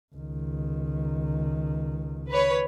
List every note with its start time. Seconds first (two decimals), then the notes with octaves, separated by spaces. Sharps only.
0.14 C#2 D#3
2.28 B4 C#5